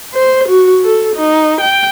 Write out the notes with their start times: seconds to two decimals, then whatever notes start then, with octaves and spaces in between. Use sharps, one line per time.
0.14 C5
0.48 F#4
0.84 A4
1.16 D#4
1.61 G5